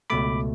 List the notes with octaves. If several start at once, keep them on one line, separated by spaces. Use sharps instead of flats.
C#2 B2 A3 B5 D6